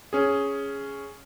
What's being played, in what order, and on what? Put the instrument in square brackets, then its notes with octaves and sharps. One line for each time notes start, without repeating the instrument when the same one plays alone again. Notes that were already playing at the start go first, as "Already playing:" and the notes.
[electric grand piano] C#4 G#4